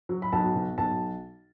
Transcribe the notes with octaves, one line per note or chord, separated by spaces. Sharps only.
F#3
B5
B1 A5
B2
B1 A5